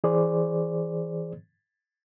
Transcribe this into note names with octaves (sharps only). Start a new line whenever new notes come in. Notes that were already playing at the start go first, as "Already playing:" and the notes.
E3 G#4 C5 D5